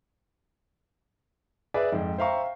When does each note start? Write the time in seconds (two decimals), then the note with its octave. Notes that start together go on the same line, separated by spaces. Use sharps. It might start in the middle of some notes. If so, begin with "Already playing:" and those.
1.74 G#4 B4 D5 E5
1.92 F2 G#2
2.18 C5 E5 F5 G5 A#5 C#6